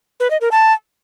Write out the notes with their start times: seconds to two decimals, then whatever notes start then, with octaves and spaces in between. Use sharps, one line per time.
0.20 B4
0.31 D#5
0.41 A#4
0.51 A5